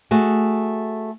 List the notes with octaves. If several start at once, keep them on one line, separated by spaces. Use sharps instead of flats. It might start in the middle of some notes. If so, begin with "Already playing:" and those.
A3 F#4 G#4